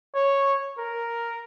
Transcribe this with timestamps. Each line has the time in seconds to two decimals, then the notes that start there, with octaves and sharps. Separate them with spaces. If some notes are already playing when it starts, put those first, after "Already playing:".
0.15 C#5
0.78 A#4